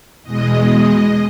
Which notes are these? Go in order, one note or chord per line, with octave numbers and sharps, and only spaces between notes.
E2 B2 G#3 D#5
D#5